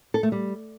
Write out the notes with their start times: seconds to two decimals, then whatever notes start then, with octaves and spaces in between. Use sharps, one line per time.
0.14 A4
0.23 A3
0.32 G3